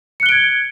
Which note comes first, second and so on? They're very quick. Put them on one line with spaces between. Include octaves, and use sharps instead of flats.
C#7 F#6 G7 D7 G#6